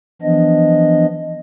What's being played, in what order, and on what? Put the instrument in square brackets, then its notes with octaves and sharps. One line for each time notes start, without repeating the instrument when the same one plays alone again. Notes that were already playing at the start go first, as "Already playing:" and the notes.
[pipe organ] E3 F3 B3 D4 D#5